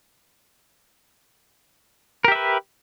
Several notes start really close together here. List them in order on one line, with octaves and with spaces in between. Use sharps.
A#4 G4 E5 B4